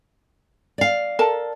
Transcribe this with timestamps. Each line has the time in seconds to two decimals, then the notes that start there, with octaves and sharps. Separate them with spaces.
0.78 D5 F5
1.19 A4 A#4 A5